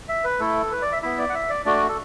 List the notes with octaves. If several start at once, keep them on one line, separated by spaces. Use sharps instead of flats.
E5
B4
A3 E4 A4
B4
D5
E5
B3 E4 E5
D5
F#5
E5
D5
A3 D4 F#4 D5
A4